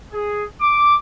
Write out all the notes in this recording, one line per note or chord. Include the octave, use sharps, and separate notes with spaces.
G#4
D6